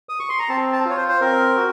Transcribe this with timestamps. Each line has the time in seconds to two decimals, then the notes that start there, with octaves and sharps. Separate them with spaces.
0.09 D#6
0.20 C#6
0.29 C6
0.39 A#5
0.49 C4 A5
0.73 A5
0.85 F4 C#5
0.97 C5
1.09 C5
1.20 C4 A#4
1.56 F#4